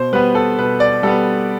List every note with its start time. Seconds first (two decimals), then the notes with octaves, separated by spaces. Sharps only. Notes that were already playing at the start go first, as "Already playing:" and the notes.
Already playing: B2 C5
0.12 G3 B3 B4
0.35 A4
0.58 B2 B4
0.80 D5
1.03 G3 B3 A4